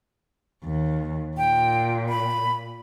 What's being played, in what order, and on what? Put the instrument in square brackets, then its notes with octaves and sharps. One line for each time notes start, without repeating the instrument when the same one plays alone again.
[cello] D#2
[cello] A#2 [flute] G5
[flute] B5